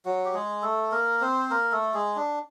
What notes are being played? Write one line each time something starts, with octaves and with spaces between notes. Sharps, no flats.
F#3 F#4
G4
G#3 G#4
A3 A4
A#3 A#4
C4 C5
A#3 A#4
A3 A4
G#3 G#4
D4